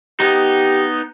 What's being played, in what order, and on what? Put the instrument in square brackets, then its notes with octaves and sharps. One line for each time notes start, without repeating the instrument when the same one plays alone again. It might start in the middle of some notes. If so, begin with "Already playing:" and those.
[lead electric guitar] B3 D#4 [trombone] G4